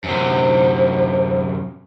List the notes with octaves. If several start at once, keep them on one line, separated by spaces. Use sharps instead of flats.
F#2 C3 C5